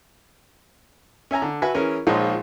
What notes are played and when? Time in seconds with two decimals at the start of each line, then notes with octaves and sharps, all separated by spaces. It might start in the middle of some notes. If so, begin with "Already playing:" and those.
1.31 C#4 E5 G#5 A#5
1.42 D3
1.62 F#4 B4 E5 G#5 E6
1.74 E3 C#4 G#4 A#4
2.07 A#1 F3 G#3 D#4 F4 C#5